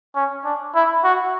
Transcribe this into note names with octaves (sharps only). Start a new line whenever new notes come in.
C#4
D4
E4
F#4